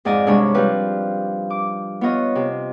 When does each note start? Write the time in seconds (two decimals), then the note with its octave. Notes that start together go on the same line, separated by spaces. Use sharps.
0.05 F2 G#2 D5 D#5 G#5
0.27 G2 C3 G#3 D4 C#5 B5
0.54 F3 G3 C4 B4
1.50 D6
2.01 B3 F4 C#5 D#5
2.35 C3